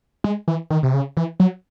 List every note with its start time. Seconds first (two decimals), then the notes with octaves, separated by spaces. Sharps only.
0.24 G#3
0.48 E3
0.70 D#3
0.83 C3
0.94 C#3
1.17 E3
1.40 F#3